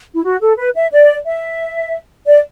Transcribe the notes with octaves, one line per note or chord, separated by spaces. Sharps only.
E4
F#4
A4
B4
E5
D5
E5
D5